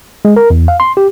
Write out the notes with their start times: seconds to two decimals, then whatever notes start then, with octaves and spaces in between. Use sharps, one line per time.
0.25 G#3
0.36 A#4
0.50 E2
0.68 F5
0.80 C6
0.97 G4